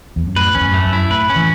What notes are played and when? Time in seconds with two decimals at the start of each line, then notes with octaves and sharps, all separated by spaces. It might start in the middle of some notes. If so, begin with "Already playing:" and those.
0.16 E2
0.27 F#2
0.36 A2 B4
0.55 E2 C#4
0.61 F#2
0.74 A3
0.85 F#2
0.93 E4
1.10 A2 B4
1.30 C#4
1.36 E3